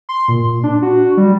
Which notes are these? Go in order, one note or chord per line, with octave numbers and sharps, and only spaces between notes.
C6
A#2
D4
F#4
G3